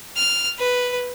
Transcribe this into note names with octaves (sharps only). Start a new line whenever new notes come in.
F6
B4